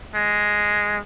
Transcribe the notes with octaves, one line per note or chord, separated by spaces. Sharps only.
G#3